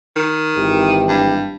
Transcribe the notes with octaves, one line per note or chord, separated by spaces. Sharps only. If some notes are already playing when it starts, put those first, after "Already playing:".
D#3
G#1 E3 G4
G2